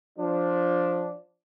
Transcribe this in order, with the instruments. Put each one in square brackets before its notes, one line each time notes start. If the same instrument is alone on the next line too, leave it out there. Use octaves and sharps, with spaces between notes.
[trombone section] F3 D4